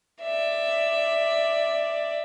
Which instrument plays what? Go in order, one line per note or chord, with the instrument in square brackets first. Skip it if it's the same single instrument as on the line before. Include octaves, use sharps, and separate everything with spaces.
[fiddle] D5 E5